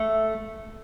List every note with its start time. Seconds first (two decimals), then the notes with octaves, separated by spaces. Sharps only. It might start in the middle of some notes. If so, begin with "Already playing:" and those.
Already playing: A3